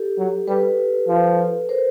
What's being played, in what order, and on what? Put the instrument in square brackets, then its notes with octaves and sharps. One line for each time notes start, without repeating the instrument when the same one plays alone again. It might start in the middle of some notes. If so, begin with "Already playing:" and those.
Already playing: [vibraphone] G4 A4
[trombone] F#3
[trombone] G3 [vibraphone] A4 B4
[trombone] F3
[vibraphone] A#4 C5